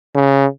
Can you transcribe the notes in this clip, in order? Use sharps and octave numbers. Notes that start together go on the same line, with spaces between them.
C#3